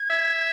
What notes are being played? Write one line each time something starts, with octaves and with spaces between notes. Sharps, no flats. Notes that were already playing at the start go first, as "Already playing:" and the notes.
Already playing: G#6
E5